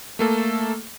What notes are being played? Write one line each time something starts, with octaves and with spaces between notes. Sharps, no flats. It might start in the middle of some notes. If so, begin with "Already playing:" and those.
A3 A#3 A4